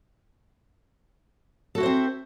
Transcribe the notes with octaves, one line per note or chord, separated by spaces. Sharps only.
C4 E4 F#4 A4 C5